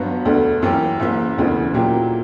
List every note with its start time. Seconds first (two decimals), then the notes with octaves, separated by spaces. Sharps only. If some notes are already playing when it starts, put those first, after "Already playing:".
Already playing: G1 G2 F#3 B3 F#4
0.25 E1 D2 D3
0.62 F#2 E3 A#3 C#4 G4
1.00 F#1 F#2 E3 A#3 E4
1.37 E1 D2 C#3 E3
1.74 A#2 F#3 A#3 E4 G4